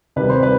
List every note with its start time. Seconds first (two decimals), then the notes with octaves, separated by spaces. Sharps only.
0.16 C3 D#3 G3 B4
0.30 C5
0.43 B4